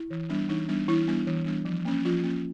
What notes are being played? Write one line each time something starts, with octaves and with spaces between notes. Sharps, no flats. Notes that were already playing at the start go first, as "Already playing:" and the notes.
Already playing: E4
E3
G3 B3 D4
E3 D#4
G3 B3 D4
E3 E4
G3 B3 D4
E3
G3 B3 D4
F3
A#3 C#4
F3 F4
A#3 C#4